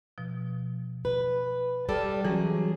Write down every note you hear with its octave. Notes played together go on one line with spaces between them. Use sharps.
B2 F3
B4
G3 A4 D5 F6 A6
E3 F#3 G3 C#4 G#4